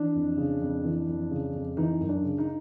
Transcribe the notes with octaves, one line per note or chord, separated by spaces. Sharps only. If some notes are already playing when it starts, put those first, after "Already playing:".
Already playing: E3 D4
F2
C#3
F2
E3
F2
C#3
F2
E3 D#4
F#2
D4
C#3
D#4